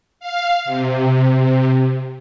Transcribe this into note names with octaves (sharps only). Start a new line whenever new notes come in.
F5
C3